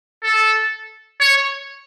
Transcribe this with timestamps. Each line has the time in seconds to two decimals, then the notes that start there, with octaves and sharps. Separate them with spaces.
0.23 A4
1.20 C#5